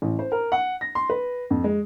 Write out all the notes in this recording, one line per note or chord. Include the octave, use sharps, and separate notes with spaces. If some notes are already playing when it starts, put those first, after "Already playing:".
A1
C5
A#4
F#5
A#6
C6
B4
F2
G#3